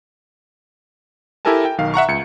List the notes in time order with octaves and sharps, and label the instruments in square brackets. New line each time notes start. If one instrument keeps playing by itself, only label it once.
[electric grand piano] E4 G4 A4 A#4 G#5 A5
G5
B1 D#3 F5
E5 F#5 A#5 C#6
C#2 C#7